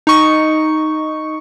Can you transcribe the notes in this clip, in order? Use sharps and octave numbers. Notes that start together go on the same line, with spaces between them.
D#4 C#6